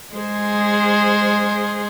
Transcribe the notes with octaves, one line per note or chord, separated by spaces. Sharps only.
G#3 G#4 C5